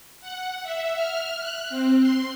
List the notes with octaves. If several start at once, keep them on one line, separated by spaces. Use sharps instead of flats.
F#5
E5
F6
F#6
C4
C6